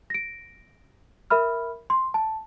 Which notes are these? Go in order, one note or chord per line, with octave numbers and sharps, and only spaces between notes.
A#6 D7
A#4 E5 B5 F6
C6
A5